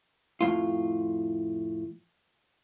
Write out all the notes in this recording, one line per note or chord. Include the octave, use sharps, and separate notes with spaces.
F2 A2 F4